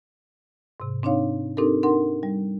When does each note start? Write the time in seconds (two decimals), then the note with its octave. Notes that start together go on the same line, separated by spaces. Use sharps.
0.80 G#2 C3
1.03 C4 D4 D#4 C#5 F5
1.57 C4 D4 D#4 G4 A4 A#4
1.83 D4 D#4 A#4 F#5 C6
2.23 G3